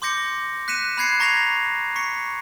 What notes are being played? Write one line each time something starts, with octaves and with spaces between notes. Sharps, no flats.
C6 D6 G6 A#6 C#7
F#6 B6 C#7 D#7 E7
B5 F#6 G#6 C7 C#7
A#5 C#6 G#6 A#6 B6 F7
C#6 B6 C#7